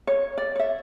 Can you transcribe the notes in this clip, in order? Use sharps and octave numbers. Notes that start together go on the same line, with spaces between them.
C#5
D5
C#5 E5